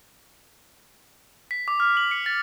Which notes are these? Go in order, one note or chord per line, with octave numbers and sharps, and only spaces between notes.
B6
D6
F6
F#7
C#7
A6